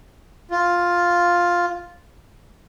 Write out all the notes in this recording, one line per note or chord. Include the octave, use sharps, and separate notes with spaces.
F4